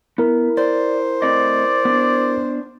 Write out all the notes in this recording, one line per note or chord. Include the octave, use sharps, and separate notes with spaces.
B3 E4 A#4
C5 D5
A3 C4 D5 D#5
B3 D4